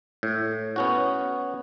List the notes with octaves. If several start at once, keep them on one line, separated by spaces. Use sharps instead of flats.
A2
B3 C#4 F#4